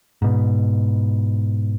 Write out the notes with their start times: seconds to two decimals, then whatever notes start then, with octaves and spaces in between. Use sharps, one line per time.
0.22 G#2 B2